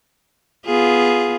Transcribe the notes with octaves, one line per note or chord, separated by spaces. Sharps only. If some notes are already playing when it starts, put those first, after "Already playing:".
B3 F4 G#4